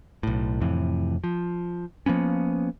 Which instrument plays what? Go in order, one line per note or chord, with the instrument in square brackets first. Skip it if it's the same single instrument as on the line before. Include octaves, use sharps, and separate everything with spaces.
[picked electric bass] B1 A2
F2 A2 C3 E3
F3
F3 A#3 B3 C#4